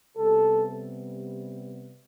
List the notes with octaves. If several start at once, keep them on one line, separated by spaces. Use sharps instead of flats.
C3 G3 B3 A4